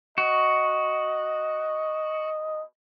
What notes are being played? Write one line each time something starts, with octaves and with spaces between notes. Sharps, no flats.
F#4 D#5